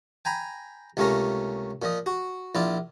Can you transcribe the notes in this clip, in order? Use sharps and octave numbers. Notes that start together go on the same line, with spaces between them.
G5 G#5 A#5 B5
C#2 C3 A3 A#3 C#4 A#4
A#2 F3 D#5
F#4
A#1 E4 F4 D5